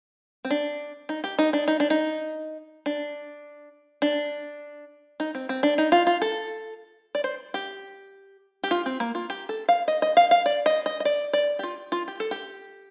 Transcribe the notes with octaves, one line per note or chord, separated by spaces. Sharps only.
C4
D4
D#4
G4
D#4
D4
D#4
D4
D#4
D4
D4
D#4
C4
C4
D4
D#4
F4
F4
A4
D5
C5
G4
G4
F4
C4
A#3
F4
G4
A4
F5
D#5
D#5
F5
F5
D5
D#5
D#5
D#5
D5
D5
G4
F4
F4
G4
A4
G4